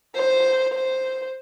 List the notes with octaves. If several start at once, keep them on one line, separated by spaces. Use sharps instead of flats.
C5
C5